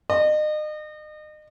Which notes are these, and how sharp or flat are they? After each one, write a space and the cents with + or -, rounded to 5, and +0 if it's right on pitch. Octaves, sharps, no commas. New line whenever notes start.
D#5 -35